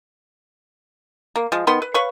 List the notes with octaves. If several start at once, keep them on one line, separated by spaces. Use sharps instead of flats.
A#3
F3 G#3
D#3 B3 C6
B4
B4 C#5 F5 C#6